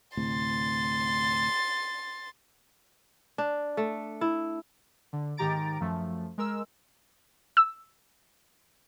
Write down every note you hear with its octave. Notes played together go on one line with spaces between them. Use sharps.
D2 A2 C3 C6 A6
D4
A3
E4
D3
G#2 D#3 G4 A#5 A6 D7
F#2 F3 A3
G#3 A#4 E6
E6